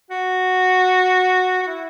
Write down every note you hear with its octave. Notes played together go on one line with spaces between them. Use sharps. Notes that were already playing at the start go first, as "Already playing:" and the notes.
F#4
F#4
E4